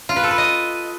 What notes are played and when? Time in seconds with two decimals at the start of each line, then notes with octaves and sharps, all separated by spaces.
0.09 F4
0.16 B4
0.23 A4
0.31 B4
0.38 D#5